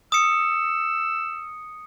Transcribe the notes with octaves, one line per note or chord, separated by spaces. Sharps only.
D#6 E6 C#7